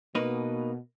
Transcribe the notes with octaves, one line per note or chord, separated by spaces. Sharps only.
B2 A#3 D#4 B4